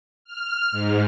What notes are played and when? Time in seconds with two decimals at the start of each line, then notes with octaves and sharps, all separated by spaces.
0.25 F6
0.72 G#2